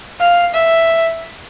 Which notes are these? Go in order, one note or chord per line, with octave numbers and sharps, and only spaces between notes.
F5
E5